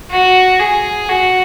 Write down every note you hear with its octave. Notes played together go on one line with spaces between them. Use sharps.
F#4
G#4
F#4